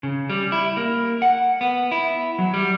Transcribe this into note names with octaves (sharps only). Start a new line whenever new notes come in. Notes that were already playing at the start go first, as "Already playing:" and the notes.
C#3
G3
E4
A#3
F#5
B3
E4
F#3
G3